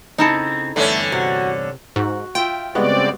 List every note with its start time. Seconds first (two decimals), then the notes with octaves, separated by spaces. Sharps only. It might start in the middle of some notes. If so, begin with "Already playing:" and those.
0.18 C#3 C4 D#4 E4 A4
0.76 E2 G2 D3 A3 C#4 B4
1.12 C3 F#4
1.96 G#2 F#4
2.35 F4 E5 G5
2.75 G2 C#3 G#3 B3 C4 F#4 D5